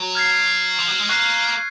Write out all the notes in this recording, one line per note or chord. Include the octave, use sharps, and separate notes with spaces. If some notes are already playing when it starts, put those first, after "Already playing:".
Already playing: F#3
F6 G#6 C7
F3
F#3
G#3
A#3 C#6 F#6 C7